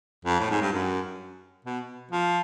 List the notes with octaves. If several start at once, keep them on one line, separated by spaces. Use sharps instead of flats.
F2
A2
G#2
G2
F#2
B2
F3